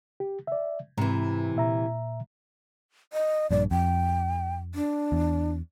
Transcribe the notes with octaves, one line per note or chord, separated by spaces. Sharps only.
G4
D5 E5
G#2 C3 E3 A#5
A#2 E5 A#5
D#5
A#1 G2 D5
F2 G5
D4
E2